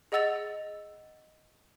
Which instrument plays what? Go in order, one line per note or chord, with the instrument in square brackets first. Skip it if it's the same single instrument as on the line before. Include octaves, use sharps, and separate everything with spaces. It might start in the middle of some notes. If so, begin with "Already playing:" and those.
[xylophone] G#4 D#5 F#5 E6 A6 F7